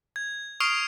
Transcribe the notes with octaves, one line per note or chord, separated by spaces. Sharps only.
G#6
C#6 D#6 F6 C7 D7 F7